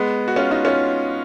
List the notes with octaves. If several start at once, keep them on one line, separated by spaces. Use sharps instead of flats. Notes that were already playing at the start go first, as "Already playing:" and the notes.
Already playing: G#3 B3
F#4
C#4 F4
D#4 F#4
C#4 F4